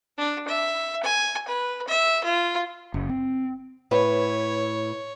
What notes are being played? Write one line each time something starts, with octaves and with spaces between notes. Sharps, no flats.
D4
E5
G#5
B4
E5
F4
F#1
C4
A2 E4 B4 C#5